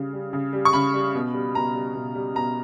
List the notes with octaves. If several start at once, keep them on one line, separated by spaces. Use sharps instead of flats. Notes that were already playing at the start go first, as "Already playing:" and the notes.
Already playing: C#3 G3
G3
C#3
G3
C#6
C#3 B5
G3
B2
G3
B2 A#5
G3
B2
G3
B2 A#5